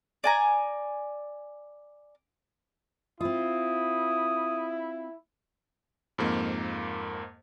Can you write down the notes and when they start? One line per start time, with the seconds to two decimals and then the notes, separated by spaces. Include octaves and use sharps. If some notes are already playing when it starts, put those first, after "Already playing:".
0.24 D5 G#5 A#5
3.21 C4 E4 F4 D#6
6.18 F2 G#2 A#3